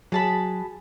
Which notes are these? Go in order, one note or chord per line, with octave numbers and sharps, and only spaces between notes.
F#3 G#4 A5 B5